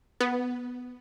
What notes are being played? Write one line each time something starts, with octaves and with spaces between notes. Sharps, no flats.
B3